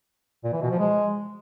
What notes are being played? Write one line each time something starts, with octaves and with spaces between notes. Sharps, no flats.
A#2
E3
B2
F3
G#3